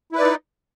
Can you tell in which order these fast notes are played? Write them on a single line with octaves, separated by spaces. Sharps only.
E4 B4 D5 D#4